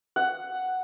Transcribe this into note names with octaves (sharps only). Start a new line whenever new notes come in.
F#5